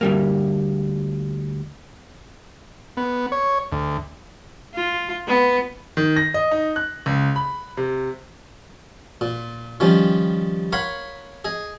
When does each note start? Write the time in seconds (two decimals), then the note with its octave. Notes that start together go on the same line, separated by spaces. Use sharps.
0.01 D2 G3 A#3
2.97 B3
3.32 C#5
3.72 D2
4.74 F4
5.27 B3
5.97 D#3
6.16 A#6
6.34 D#5
6.51 D#4
6.76 F#6
7.06 C#2
7.36 B5
7.77 C3
9.21 A#2
9.80 D#3 F3 G3 C#4
10.72 A#4 C#5 F5 F#5 B5 C6
11.45 G#4 D#5